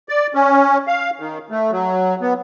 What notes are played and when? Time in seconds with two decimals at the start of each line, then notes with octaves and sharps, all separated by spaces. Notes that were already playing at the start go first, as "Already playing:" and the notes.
0.09 D5
0.34 C#4
0.87 F5
1.20 D#3
1.50 A3
1.71 F#3
2.22 B3